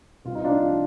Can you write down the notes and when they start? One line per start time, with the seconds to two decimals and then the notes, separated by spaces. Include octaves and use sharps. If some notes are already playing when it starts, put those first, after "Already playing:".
0.25 C2 F4
0.35 D#4
0.44 D4 F4
0.63 F3